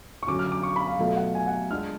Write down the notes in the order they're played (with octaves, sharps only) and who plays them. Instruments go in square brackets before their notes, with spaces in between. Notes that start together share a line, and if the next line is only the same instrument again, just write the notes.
[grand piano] C#6
[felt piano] D3 F#3 C#4 F#4 [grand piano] D6
[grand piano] F6
D6
C#6
B5
F5
[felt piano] B2 F#3 A3 F4 A4 [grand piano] F5
[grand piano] F#5
G#5
F#5
[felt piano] G#3 D4 F4 [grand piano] F6